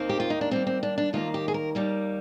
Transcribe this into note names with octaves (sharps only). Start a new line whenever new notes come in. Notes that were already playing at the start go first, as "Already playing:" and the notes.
Already playing: D#2 D#3 A#3 C4
G4
F4
D#4
D4
D#2 D#3 G3 A#3 C4
C4
D4
D4
D#2 D#3 G3 A#3 F4
G4
G#4
A#4
D#2 D#3 G3 A#3